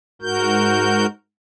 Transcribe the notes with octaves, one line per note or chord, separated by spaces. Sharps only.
G#2 F#4 A#4 G6